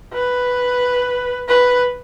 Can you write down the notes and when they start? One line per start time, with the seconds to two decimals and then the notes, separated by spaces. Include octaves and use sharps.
0.13 B4
1.48 B4